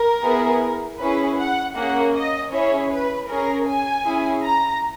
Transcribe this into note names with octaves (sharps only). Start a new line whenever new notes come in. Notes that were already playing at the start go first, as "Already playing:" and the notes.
Already playing: A#4
B3 E4 G#4
C#4 E4 G#4 B4
F#5
A#3 C#4 G#4 F#5
D#5
C#4 E4 G#4 C#5
B4
C#4 G#4 A#4
G#5
C#4 E4 G#4
A#5